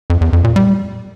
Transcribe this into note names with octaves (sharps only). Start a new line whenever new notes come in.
F2
E2
F2
A#2
G3